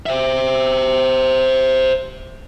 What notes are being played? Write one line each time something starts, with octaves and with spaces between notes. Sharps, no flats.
C5 E5